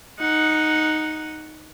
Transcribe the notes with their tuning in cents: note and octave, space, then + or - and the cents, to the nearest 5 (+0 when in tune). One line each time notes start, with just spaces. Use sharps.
D#4 +0 F#5 +0